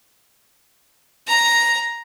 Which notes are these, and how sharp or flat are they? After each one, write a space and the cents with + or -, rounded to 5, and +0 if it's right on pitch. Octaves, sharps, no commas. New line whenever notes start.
A#5 +5